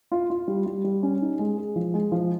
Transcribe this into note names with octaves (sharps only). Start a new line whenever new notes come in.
F4
F4
G3
G3
G3
C#4
D#4
G#3
G#4
F3
G#3
F3